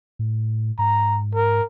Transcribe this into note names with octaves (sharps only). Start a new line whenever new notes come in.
A2
G#2 A#5
A#4